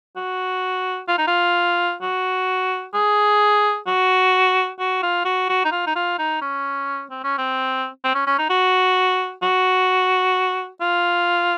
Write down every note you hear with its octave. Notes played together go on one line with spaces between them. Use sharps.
F#4
F4
D#4
F4
F#4
G#4
F#4
F#4
F4
F#4
F#4
D#4
F4
D#4
F4
D#4
C#4
C4
C#4
C4
C4
C#4
C#4
D#4
F#4
F#4
F4